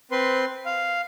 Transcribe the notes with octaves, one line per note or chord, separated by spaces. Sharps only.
C4 B4 C6
F5